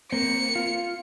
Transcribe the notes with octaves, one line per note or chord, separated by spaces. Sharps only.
A#3 C4 C#7
F4